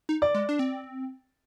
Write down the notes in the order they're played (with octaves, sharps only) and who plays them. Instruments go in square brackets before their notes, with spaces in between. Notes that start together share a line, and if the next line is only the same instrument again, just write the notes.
[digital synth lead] D#4
[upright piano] D5
[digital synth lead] G#3
D4
C4